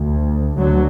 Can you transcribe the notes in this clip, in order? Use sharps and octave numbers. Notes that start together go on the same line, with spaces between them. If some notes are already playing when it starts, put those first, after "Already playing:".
Already playing: D2
D2 D3 F#3